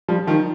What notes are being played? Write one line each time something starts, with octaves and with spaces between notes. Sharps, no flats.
F3 G3
D#3 F3